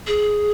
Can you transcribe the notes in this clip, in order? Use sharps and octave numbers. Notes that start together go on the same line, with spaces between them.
G#4